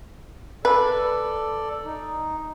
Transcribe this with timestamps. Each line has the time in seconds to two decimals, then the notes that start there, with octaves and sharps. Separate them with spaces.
0.65 A4 B4 D5
1.85 D#4